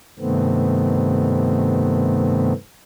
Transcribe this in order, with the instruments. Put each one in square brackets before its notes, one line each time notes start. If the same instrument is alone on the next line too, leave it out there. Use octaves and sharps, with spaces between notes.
[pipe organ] G2 C3 D#3 A3 B3 C4